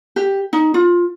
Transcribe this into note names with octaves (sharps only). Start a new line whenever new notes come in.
G4
D#4
F4